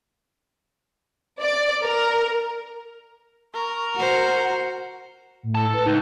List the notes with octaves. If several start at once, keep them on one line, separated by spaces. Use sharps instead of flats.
D5
A#4
A#4 C#6
F#4 C5 F#5
A2
A4 A5
B4
C#2 D#4